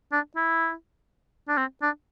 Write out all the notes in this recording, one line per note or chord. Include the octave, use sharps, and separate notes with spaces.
D4
E4
D4
C4
D4